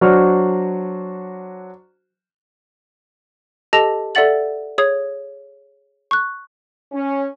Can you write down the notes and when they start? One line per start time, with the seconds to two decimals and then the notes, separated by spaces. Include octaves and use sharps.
0.01 F#3 D4 F#4 C5 F6
3.73 G4 A4 D#5 A5 A#6 F7
4.15 A4 D5 E5 F#5 A6 F#7
4.78 G#4 C#5 D#6 G#6
6.11 C#6 F#6
6.92 C#4